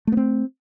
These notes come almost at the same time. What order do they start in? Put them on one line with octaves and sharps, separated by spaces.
A3 B3 C4